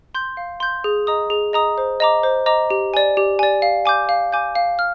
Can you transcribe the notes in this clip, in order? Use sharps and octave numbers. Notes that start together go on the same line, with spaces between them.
C6 G6
F5
C6 G6
G#4
D#5 A#5 D#6
G#4
D#5 A#5 D#6
C5
D#5 A#5 D6
C5
D#5 A#5 D6
G4
D5 G#5
G4
D5 G#5
F5
G#5 D6 G6
F5
G#5 D6 G6
F5
F6